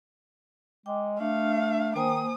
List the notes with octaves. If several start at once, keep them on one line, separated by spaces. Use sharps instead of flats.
G#3 G5 D6
A3 D4 F5
D#3 A#3 C5 G#5 D#6